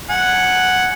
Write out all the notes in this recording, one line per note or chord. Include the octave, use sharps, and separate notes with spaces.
F#5 G#5